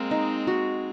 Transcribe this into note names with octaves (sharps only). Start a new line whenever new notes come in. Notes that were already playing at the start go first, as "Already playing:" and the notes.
Already playing: G#3 A#3 C4
D#4
F#4